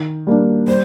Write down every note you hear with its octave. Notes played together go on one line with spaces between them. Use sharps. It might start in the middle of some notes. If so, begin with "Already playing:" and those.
Already playing: D#3
G3 A#3 D4
G3 C5